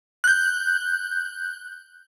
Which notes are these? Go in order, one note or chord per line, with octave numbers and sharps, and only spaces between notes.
F#6 G6